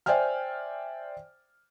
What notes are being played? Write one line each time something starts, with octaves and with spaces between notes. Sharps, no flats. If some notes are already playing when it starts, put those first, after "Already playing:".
C5 D5 E5 G5 G#5 F6